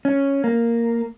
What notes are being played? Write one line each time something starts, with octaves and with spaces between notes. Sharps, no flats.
C#4
A#3